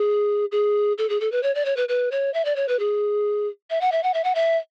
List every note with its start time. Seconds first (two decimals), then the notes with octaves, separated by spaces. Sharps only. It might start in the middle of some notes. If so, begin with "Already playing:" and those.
Already playing: G#4
0.52 G#4
0.98 A4
1.10 G#4
1.21 A4
1.32 B4
1.43 C#5
1.55 D5
1.65 C#5
1.77 B4
1.89 B4
2.12 C#5
2.34 E5
2.45 D5
2.56 C#5
2.68 B4
2.79 G#4
3.70 E5
3.81 F#5
3.92 E5
4.03 F#5
4.14 E5
4.24 F#5
4.35 E5